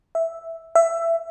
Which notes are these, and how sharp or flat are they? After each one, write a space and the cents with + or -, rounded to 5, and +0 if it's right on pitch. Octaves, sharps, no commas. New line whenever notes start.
E5 +0
E5 +15